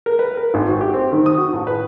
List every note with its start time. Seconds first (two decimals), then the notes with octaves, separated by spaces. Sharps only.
0.06 A#4
0.19 B4
0.37 A#4
0.54 G#1
0.67 F#4
0.81 G4
0.94 C4
1.12 D#3
1.26 D#6
1.37 F#4
1.53 A1
1.67 B4